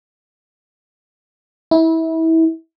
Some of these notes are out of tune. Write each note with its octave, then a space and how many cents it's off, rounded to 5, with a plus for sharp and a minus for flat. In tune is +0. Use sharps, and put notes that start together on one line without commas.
E4 -25